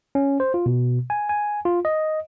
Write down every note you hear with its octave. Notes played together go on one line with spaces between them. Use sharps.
C#4
C5
F4
B2
G#5
G#5
F4
D#5